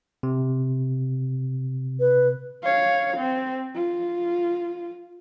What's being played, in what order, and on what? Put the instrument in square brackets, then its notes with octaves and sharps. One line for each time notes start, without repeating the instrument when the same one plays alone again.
[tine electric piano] C3
[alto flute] B4
[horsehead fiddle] C#5 F5
C4
F4